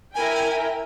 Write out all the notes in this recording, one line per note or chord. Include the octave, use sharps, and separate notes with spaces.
E4 A#4 G5 G#5